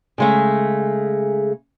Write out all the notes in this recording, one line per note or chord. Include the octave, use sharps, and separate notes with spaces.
C#3 G#3 A3